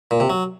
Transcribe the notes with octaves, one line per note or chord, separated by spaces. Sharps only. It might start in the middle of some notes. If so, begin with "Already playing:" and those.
A#2
C3
F#3